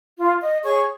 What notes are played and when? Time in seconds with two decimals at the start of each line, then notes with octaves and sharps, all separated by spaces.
0.17 F4
0.41 D#5
0.64 G#4 C#5 C#6